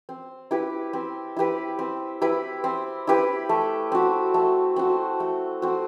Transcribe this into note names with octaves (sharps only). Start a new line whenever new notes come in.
C4
E4 G4 B4
C4
E4 G4 B4
C4
E4 G4 B4
C4
E4 G4 B4
A3
C4 F#4
A3
C4 F#4
A3
C4 F#4